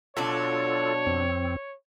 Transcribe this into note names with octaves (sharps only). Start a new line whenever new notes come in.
B2 F#3 D4 F4 A4 C#5
F2 C4